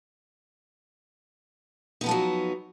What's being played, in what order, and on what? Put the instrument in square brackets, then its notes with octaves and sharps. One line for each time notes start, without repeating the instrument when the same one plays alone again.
[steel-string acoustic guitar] D#4
B3
F3
A3
F#3